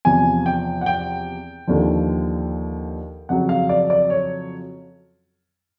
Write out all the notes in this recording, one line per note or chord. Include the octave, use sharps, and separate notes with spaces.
E2 C3 F3 G#5
G5
F#5
G5
D#2 D3 F3
F2 C#3 F#3 F#5
F5
D5
D5
C#5